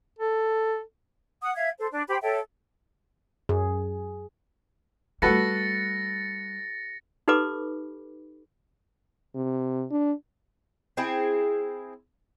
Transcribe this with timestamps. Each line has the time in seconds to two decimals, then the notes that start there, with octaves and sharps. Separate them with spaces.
0.19 A4
1.42 F#5 D#6
1.56 E5 F5 G#6
1.79 A4 C5
1.91 D4
2.09 G4 C5 G5 B5
2.22 A4 C#5 E5 G5
3.49 F#2 G#4
5.22 G3 A3 F#4 A4 B4 A6 A#6 C#7
7.28 D#4 G4 A4 B4 B5 D6
9.35 C3
9.91 D4
10.97 C4 E4 G#4